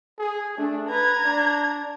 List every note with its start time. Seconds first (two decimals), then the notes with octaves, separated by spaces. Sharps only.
0.19 G#4
0.58 A3 D4
0.89 B4 A#5 G#6
1.25 D4